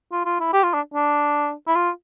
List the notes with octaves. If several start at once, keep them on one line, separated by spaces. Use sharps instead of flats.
F4
F4
E4
G4
F4
D4
D4
E4
F4